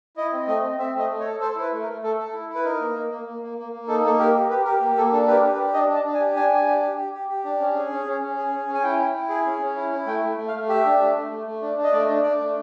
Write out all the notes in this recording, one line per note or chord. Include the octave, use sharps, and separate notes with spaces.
E4 D#5
C4
A3 D#5
C4
C4 E5
A3 D#5
A3
C#5
A4
A4 C5
E4
B4
A3
A#4
A3
A3 A4
A4
E4
E4
B4
D#4 A#4
A#3
A#3
A#3
A#3
A#3
A#3
A#3
D#4 A4
A#3 A4
G4 A#4
G4
G4 B4
G4 A#4
A#3
A#3 A4
D4 A4
G4 B4
A#4
G4
B4
D4
D4 D#5
D4
A5
D4
G#5
G4
D4 G#5
D4
G4
G4
G4
G4
G4
D4
C#4
G#4
C#4
C#4
C#4
G#4
C#4
C#4
G#5
E4 G5
E4
E4
G#4
C#4
C#4
E4
E4
A3 G5
A3
A3
F5
A3
G4 E5
D4
A3
A3
A3
A3
D4
D4
D#5
A3 D5
D4
D4 D5
A3